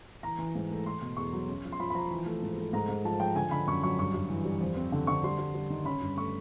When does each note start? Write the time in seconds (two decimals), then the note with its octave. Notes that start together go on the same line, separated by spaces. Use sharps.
0.23 E3 A#5
0.39 E3
0.55 G#2
0.71 A3
0.86 A3 C6
1.02 B2
1.17 E2 C#6
1.33 F#3
1.48 C#4
1.65 F3
1.73 C6
1.80 F3 B5
1.90 B5
1.95 F3 A#5
2.10 E3
2.26 A3
2.42 G#2
2.58 A3
2.73 G#2 A#5
2.89 G#2
3.05 F3 A5
3.20 F3 G5
3.35 D3 G#5
3.51 D3 B5
3.67 F#2 C#6
3.83 F#3 C#6
3.99 G2 C#6
4.14 G2
4.29 E3
4.45 G3
4.61 F2
4.77 C4
4.92 D3
5.07 D3 C#6
5.24 G3 C6
5.39 G3
5.54 G3
5.70 D#3
5.85 C#4 B5
6.01 G2
6.17 A3 C#6